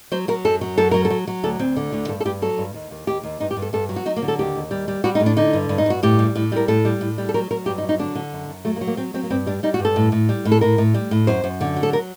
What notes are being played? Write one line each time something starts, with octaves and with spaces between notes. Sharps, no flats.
F#3 C5
F#3 A#4
F#2 A4
F#3
F#2 A4
F#3 A#4
A4
F#3
F#3
D2 A4
D2 C4
D3
D2
G2 A4
A4
G2 G4
F#3 A4
G2
D#2
D#2
D#2 G4
D#2
G2 D#4
G4
G2
A4
G2 A4
F#3
F#4
F#3 D#4
A#3
D3
A4
D#2 G4
D#2
G3
G3
G3 F#4
D#4
A2
D4
D3 D#4
G2
G2
D#4
G2 F#4
A2 G4
G3
A2
G3 A#4
A2 A4
G3
A2
G3
A4
F#3 A#4
F#3 A#4
G2 G4
D#4
F#3
D#4
D3 D4
D3
F#2
F#2
F#3 A3
A#3
F#3
A#3
F#3 C4
F#3 C4
A#3
G2 C4
G3 D4
G3 D#4
F#4
G2
A4
A2
A2
G3
A2
A4
A2 A#4
A2
G3
A2
F#2 C5
F#2
D3
F#3
A4
A#4